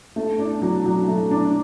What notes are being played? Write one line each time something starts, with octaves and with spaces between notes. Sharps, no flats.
A3
D4
F#3
F#3
A3
D4